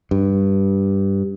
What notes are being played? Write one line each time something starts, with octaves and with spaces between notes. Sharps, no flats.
G2